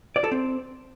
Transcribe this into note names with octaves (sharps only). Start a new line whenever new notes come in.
D5
A4
C4